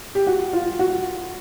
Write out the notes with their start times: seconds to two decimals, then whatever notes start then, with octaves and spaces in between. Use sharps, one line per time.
0.15 G4
0.27 F#4
0.53 F4
0.79 F#4